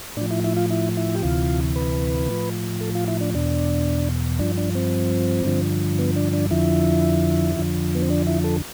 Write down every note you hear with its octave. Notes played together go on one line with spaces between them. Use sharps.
A2 F3 D4
E4
E4
F4
E4
E4
G4
D2 C3 E3 F4
B4
A2 F3
A4
F4
E4
D4
E2 B2 D4
G2 F3 D4
D4
C4
G2 D3 F3
B3
D4
D4
F2 D3 F3 E4
F2 D3 F3
B3
C4
D4
E4
A4